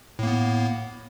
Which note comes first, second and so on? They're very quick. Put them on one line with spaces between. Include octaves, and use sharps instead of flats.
A2 A#3 B3